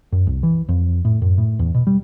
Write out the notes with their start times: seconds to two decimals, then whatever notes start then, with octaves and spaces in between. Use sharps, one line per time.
0.12 F#2
0.27 C2
0.43 E3
0.69 F2
1.05 A2
1.22 F#2
1.38 A2
1.59 E2
1.74 B2
1.87 G3